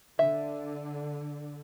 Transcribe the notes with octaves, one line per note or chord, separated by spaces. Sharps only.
D3 E5